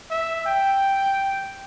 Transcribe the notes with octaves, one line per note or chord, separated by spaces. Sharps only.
E5
G5